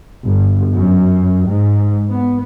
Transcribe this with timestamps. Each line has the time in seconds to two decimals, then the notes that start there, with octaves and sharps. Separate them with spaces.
0.25 G1
0.73 F#2
1.47 G#2
2.11 B3